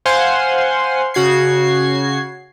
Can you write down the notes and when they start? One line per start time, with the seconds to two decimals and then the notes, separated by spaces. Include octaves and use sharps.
0.05 C5 F5 F#5 G#5 C6
1.14 C#3 F#4 G#6 C7